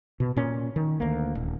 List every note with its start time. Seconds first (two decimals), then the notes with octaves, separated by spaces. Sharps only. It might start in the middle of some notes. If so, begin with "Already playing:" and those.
0.20 B2
0.36 A#2 C#4
0.76 D#3
1.00 D2 A#3
1.35 D#1